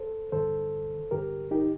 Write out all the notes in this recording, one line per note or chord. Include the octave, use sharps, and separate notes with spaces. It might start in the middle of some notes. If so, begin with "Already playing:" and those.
Already playing: A4 C5
G2 D3 A4 C5
G2 D3 G4 A#4
D#4 G4